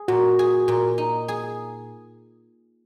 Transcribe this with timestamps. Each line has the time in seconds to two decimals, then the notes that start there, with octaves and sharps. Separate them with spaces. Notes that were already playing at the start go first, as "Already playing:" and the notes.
Already playing: G#4
0.08 A#2 F#4
0.39 G#4
0.68 A#2
0.98 D#4
1.28 G#4